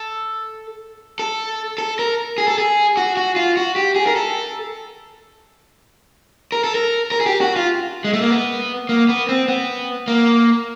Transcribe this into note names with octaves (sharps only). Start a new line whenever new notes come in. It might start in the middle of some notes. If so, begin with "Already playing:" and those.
Already playing: A4
A4
A4
A#4
G#4
A4
G#4
F#4
F#4
F4
F#4
G4
G#4
A#4
A4
A#4
A4
A#4
A#4
G#4
G4
F#4
F4
G#3
A3
A#3
B3
A#3
B3
C4
B3
A#3